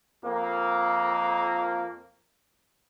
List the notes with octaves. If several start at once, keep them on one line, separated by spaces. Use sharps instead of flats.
F2 A#3